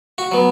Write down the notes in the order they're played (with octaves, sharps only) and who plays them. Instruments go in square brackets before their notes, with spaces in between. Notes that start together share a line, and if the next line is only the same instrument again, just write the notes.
[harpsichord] F#4
F#3 B3